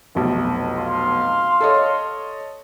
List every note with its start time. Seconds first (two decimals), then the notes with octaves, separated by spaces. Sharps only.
0.15 F1 B1
0.77 F5 C6
1.60 A4 C#5 D#5